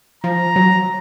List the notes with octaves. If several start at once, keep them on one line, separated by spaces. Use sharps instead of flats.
F3 A#5
F#3